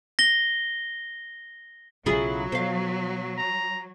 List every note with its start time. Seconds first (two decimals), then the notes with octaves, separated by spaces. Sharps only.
0.19 A#6 G7
2.06 B1 C#3 F#3 E4 F4 G#4
2.52 B2 C5 F5
3.38 A#5